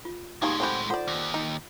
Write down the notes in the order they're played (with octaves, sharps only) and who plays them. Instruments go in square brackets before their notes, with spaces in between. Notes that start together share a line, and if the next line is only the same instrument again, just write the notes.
[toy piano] F4
[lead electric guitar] A2 G#3 [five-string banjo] G3 A#3 G#4 [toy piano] D#4 G4
[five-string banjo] C4 F#4 G4 [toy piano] A4 G#5 B5
[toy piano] F4 A4 F#5 [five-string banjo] C5 D5
[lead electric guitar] D#2
[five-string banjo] D#4